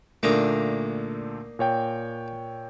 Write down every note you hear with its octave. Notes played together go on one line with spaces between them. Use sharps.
A#2 D3 A3 A#3 D4 D#4
A#2 C#5 G5